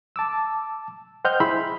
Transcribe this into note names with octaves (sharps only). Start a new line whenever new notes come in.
A5 D6 E6
C5 D#5 F#5 G5 F6 G6
E4 G#4 E5 B5 C6